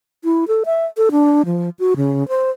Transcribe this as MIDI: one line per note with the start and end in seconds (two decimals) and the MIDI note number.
0.24 0.48 64
0.48 0.63 69
0.66 0.86 76
0.97 1.09 69
1.11 1.42 62
1.46 1.70 53
1.79 1.94 66
1.97 2.27 49
2.28 2.51 72